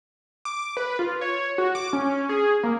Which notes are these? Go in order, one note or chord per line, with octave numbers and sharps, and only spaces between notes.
D6
B4
F4
C#5
F#4
D6
C#4
G#4
A#3